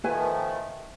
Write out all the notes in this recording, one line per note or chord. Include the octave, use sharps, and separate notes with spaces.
D#3 F3 A3 E4 B4 G#5